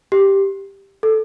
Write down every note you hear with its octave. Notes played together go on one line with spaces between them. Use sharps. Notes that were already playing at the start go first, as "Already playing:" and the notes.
G4
A4